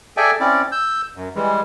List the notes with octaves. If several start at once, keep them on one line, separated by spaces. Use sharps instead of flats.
G#4 A4 D5 E5 G5 G#5
C4 C#4 E4 D5
E6 G6
F#2
E3 G3 G#3